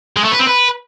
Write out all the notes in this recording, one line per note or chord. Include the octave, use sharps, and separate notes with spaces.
G#3
A3
B4
C4
B4